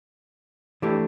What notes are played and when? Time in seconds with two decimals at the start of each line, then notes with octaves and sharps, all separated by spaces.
0.82 E3 A3 D4 G4